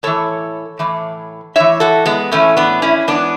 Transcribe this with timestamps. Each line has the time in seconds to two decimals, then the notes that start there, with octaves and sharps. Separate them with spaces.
0.03 A2 E3 A4 C#5
0.79 A2 E3
1.56 A2 E3 C#5 E5
1.80 F#4 A4
2.06 G#3 B3
2.32 A2 E3 A3 C#4
2.57 B3 D4
2.82 C#4 E4
3.07 G#2 E3 B3 D4